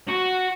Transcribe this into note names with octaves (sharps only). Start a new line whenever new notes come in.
F#4